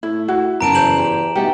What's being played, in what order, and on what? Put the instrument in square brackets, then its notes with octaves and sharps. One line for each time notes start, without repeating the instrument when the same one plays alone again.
[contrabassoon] A2 [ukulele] E4
[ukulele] E4 F#4
[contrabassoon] B1 [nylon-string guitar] F#2 C#3 A5 [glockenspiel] A#5 D7 E7
[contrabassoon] E2 [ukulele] C5 [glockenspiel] G6 E7 F#7
[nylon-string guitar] G4 G#5
[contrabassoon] B2 [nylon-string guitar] A3 D#4 F#5 [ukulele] G4